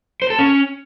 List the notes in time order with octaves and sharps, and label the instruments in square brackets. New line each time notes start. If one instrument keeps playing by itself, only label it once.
[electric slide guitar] C5
A4
C#4